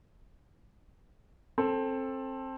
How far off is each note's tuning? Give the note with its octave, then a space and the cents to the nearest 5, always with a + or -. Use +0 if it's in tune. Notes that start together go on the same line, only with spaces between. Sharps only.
C4 +20 A4 +0